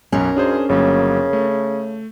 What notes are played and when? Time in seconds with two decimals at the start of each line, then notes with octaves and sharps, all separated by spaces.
0.12 B1 F#2 C#4 A#4
0.36 F#2 D4 G#4 C5
0.69 G1 C#3 F#3 A#3
1.33 A3